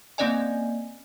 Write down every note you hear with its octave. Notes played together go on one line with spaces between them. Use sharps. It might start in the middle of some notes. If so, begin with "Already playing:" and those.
A#3 C4 C#4 D5 D#5 G#5